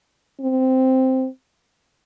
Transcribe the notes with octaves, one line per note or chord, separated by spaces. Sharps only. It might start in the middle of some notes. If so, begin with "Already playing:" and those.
C4